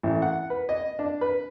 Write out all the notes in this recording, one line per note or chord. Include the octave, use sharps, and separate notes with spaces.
A1
F#5
B4
D#5
D4
B4